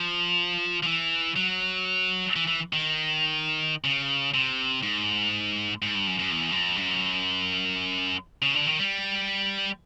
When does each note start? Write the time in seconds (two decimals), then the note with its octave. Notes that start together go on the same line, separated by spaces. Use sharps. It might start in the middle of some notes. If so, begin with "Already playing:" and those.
Already playing: F3
0.83 F3
0.86 E3
1.36 F#3
2.36 E3
2.47 E3
2.73 D#3
3.84 C#3
4.34 C3
4.83 G#2
5.82 G#2
5.95 G2
6.07 F#2
6.19 F#2
6.31 E2
6.51 F#2
6.56 F2
6.77 G2
6.81 F#2
8.42 C#3
8.54 D3
8.67 D#3
8.80 G3